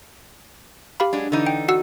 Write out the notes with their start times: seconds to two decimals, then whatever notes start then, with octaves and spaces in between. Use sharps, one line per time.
1.00 G4 F5 B5
1.13 F#3 G#3 D4
1.32 D3 E3 D#4
1.46 G5
1.68 F#4 F#5 E6